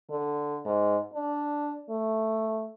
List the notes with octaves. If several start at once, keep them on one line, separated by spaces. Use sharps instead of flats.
D3
G#2
D4
A3